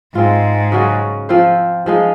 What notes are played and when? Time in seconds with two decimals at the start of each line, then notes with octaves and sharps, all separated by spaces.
0.15 G#2 G#3 C4 F4
0.72 C#3 F#3 C#4 F#4
1.29 F3 C4 F4 C5
1.86 F3 G#3 D#4